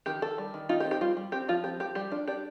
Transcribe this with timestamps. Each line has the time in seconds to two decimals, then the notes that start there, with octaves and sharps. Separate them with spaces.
0.06 D#3 G4
0.22 D#3 A4
0.38 G3
0.54 D#3
0.69 D#4 F4
0.80 G4
0.85 C4
0.91 G4
1.01 G3 F4
1.17 G3
1.32 C4 G4
1.48 F3 F4
1.64 C4 G4
1.80 F3 G4
1.95 G3 G4
2.11 D4 F4
2.28 D4 G4